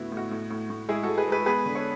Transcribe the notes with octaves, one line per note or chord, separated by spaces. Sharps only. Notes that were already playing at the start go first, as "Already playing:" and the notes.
Already playing: A2 D3 B3 E4 F#4
A2 F#4
A2
A2
A2
G#3 E4 G#4
G#3 F#4 A4
G#4 B4
G#3 G#4 B4
B3 G#4 B4
D3
A4 C#5